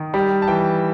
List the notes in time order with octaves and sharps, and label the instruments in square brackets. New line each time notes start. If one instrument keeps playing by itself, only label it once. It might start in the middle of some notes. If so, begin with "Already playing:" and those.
Already playing: [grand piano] D#3
G3 G5
A5
E3 G5